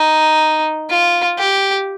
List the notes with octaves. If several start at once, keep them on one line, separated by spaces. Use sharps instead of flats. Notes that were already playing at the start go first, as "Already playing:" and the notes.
Already playing: D#4
F4
G4